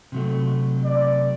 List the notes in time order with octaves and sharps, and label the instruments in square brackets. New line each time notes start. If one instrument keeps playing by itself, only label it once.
[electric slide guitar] C3 F#3 A3
[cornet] D5